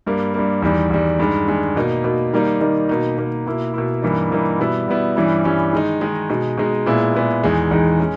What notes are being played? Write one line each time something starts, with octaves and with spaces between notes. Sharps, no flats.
G2 G3 A#3
G2 G3 A#3
E2 D#3 G3
E2 D#3 G3
G2 D#3 G#3
G2 D#3 G#3
B2 A#3 D#4
B2 A#3 D#4
D#3 G3 A#3 D#4
D#3 G3 A#3 D#4
B2 A#3 D#4
B2 A#3 D#4
B2 A#3 E4
B2 A#3 E4
G2 E3 A#3 D#4
G2 E3 A#3 D#4
B2 G3 B3 E4
B2 G3 B3 E4
G2 E3 G3 C#4 E4
G2 E3 G3 C#4 E4
D#3 G#3 D#4
D#3 G#3 D#4
B2 G#3 D#4
B2 G#3 D#4
A#2 G#3 B3 E4
A#2 G#3 B3 E4
E2 D#3 G#3 D#4
E2 D#3 G#3 D#4
G#3 C#4